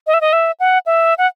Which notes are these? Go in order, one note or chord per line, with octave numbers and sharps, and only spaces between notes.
D#5
E5
D#5
E5
F#5
E5
F#5